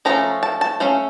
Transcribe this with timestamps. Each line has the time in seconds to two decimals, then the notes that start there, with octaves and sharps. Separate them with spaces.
0.05 F3 A3 C#4 A#5
0.43 A5
0.61 A5
0.80 A3 C#4 F5